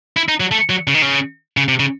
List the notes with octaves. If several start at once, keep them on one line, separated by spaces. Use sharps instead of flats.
E4
D#4
F#3
A3
F#3
C#3
D#3
C#3
C#3
C3
C#3